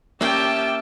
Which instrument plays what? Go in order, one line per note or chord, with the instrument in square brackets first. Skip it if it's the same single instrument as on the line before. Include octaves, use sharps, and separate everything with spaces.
[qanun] A#3 C#4 A#4 [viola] G4 A5 [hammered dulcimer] E5 [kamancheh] G5